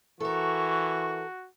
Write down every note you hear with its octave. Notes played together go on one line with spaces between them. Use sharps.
E3 F#4 A4 A#4 C#6